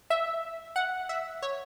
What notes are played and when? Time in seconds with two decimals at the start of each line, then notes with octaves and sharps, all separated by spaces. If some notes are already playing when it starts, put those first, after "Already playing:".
0.10 E5
0.76 F#5
1.09 E5
1.42 C#5